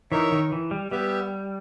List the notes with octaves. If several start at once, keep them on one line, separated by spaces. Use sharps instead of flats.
E3 D#4 A#4 C#5 E5
D#3
E3
G3
G3 B3 G4 B4 E5